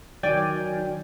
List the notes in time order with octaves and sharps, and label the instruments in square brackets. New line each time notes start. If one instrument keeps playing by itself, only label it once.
[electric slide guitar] D#3 F#3 [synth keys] D5 G5 G#5